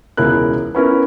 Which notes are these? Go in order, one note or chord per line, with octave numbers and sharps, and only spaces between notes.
E1 C#2 E4 A#4 F#6
B3 C#4 E4 A#4